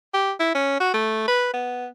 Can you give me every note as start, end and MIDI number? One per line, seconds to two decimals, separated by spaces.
0.14 0.32 67
0.40 0.52 64
0.55 0.78 61
0.80 0.93 66
0.94 1.25 57
1.28 1.49 71
1.54 1.87 59